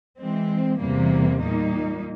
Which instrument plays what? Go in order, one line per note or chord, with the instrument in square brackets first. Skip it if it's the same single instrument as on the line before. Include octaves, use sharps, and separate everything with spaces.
[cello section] E3 G#3 C4
E2 C3 E3 G3 A#3
A#2 G3 A#3 D#4